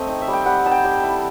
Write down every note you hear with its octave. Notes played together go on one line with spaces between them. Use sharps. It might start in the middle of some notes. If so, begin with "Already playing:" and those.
Already playing: A3 C4 D#5
D#4
E5
G3
G5
G3 F#5
D#4 A5
G5
G3
E4